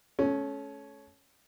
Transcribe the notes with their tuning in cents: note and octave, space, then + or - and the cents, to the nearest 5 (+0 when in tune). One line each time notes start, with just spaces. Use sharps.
A3 -35 C#4 +0